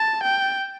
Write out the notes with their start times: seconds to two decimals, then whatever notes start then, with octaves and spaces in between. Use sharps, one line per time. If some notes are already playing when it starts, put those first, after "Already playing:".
Already playing: A5
0.23 G5